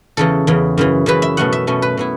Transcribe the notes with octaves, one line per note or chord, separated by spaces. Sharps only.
E2 C#3 E3 A4
E2 C#3 E3
F#2 C#3 E3
F#2 C#3 E3 B4
E5
B2 A3 C#4 F#5
E5
B2 A3 C#4
B4
B2 B3 E4